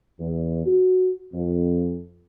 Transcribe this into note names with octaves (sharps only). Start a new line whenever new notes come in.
E2
F#4
F2